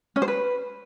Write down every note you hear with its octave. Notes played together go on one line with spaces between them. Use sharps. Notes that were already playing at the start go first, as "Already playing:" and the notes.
C#4
C5
B4